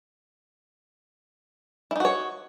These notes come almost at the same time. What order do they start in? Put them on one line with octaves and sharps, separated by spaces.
E4 D#4 F#4 C#5